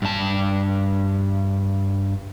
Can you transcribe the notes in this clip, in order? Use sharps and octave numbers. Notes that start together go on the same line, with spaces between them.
G2 A5